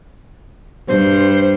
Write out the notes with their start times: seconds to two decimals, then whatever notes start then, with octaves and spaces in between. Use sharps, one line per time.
0.88 G2 C5